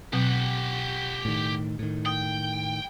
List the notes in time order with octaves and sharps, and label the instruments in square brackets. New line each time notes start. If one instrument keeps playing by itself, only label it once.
[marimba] B2 F#3 C4 [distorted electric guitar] G4 F#5
[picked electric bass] A2 D#3
A2 D#3
[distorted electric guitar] G5 [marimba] D#6